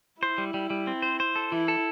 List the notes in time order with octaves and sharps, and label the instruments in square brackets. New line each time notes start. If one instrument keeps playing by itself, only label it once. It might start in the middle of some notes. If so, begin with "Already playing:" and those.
[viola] E4 [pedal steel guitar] C5
[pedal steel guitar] G3
G3
G3
C4
C5
C5
A4
[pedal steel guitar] E3 [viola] E4
[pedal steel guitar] A4